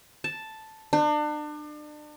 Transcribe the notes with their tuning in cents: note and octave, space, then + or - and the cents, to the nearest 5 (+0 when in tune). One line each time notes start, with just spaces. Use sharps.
A5 +0
D4 +35